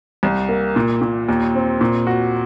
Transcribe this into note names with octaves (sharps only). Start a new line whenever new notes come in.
C2
A#3
A#2
A#2
D#2
C4
A#2
F#4